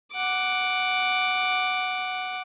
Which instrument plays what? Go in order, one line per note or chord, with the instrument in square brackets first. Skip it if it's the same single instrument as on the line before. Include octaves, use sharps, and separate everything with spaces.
[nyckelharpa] F#5 D6